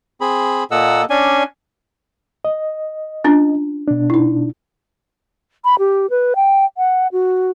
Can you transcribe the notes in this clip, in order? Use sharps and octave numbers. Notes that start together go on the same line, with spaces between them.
C4 G#4 B5
A#2 A#3 A4 D#5 F#5 E6
C#4 D4 D5 G#5
D#5
C#4 D4 F4
B2 D4
D#4 E4
B5
G4
B4
G5
F#5
F#4